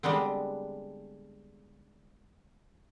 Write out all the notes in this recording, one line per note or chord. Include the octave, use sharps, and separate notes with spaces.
D3 G3 G#3 B3 C4